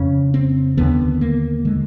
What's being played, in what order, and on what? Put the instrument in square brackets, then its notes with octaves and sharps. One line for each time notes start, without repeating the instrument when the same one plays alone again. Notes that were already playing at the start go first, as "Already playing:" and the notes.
Already playing: [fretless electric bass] F2 C#3 C#4
C4
D#2 D3 B3
A#3
D3 G#3